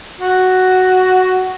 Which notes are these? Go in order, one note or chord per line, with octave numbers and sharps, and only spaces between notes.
F#4